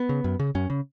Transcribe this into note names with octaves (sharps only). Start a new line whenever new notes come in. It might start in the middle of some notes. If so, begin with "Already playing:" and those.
Already playing: B3
C#3
F#2
C#3
F#2 C#4
C#3